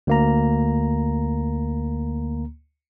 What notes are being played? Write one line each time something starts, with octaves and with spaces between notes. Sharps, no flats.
D2 A#3 A#5